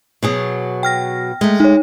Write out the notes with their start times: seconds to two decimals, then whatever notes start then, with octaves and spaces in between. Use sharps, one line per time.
0.23 B2 F#3 G#4
0.83 G5 F6 A#6
1.41 G#3 A3
1.60 D#4 C#5